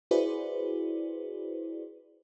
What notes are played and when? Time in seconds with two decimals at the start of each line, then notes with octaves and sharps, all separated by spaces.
0.11 E4 F#4 G#4 B4 C5 D5